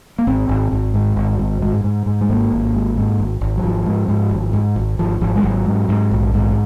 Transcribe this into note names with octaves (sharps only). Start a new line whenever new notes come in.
A#3
G#1 C4
G#1
G#1
G#2
G#1
G#2
G#2
G#2
G#2
G#3
G#1 A#3
G#1
G#2
G#2
G#1
G#1
F#3
G#1 F3
G#2
G#2
G#1
G#2
G#1
G#1 F3
G#1 F3
G#3
G#1 F#3
G#2
G#2
A#1
G#2